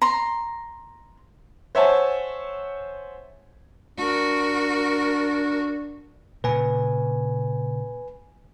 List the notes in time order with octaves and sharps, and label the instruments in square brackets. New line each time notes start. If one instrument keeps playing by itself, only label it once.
[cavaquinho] A#5 C6
[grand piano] C5 C#5 E5 F#5 G#5 A5
[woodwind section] D4 [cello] F#4 A#4
[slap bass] A#2 C#3 [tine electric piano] B4 G#5